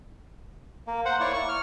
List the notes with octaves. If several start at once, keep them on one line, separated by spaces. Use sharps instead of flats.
A#3
C5 F#5
A#3 E4 C#5 D5 C#6
C#6
F6